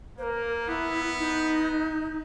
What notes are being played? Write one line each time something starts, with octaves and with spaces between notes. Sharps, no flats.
A#3 A#4 C5
B3 E4
D#4